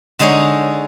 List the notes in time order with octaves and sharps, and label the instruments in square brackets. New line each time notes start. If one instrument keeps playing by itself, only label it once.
[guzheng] D3 G#3 D#4 G#4 C#5